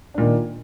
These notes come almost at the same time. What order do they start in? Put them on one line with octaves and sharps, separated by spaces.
D4 A#2 D#3